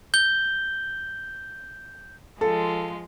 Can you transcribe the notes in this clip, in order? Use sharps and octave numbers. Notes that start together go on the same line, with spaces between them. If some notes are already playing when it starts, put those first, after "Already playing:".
G6 G7
F3 G#3 F4 A4